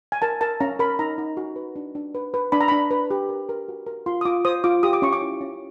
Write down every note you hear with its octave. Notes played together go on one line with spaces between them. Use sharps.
G#5
A#4 A5
A#4 A5
C#4 A#5
A#4 B5
D#4 A#5
D#4
F#4
B4
D4
D4
B4
B4
D4 B5
A#5
D4 B5
B4
G4
A#4
A#4
F#4
A#4
F4 C6
D#6
F4 D6
C5 D#6
F4 D6
G4 D#6
D6
C#4 C#6
D6
E4
C#4